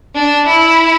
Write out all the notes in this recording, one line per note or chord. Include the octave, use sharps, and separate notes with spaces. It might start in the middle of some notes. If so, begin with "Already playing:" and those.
D4
E4